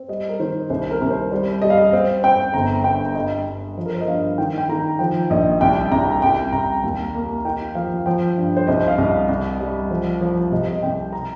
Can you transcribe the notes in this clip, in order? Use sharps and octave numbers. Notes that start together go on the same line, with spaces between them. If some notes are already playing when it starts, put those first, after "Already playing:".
Already playing: C4
G3 D#5
A#4
D#3 C5
C2 C5
A#4
C2
C5
G3 C5
G3 D#5
F5
D#5
C4
C4 G5
G1 A#5
G2 G5
G2 D#5
G2
F3
A#4
C5
D#5
G2 F5
D#3 G5
G5
D#3 A#5
F3 G5
A#1 D#5
C2 G5
C2 A#5
C2 G5
C2 A#5
D#2
A#3
D#4 G5
F3 F5
F3 G5
G2
C5
C2 D#5
F5
C2 D#5
C2
G3
F3
F3
C3 D#5
D#5
C2 G5
A#5